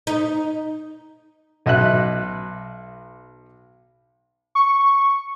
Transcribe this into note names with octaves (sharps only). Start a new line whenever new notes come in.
D#4
B1 D#5 E5 F#6
C#6